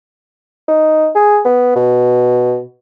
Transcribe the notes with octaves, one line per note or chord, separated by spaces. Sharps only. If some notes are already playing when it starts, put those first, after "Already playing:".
D#4
G#4
B3
B2